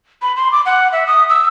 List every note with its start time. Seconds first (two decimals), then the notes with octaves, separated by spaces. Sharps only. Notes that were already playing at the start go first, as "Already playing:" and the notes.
0.22 B5
0.37 C6
0.52 D6
0.66 F#5
0.92 E5
1.07 D#6
1.30 E6